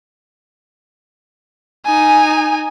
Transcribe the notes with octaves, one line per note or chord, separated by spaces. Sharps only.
D#4 G#5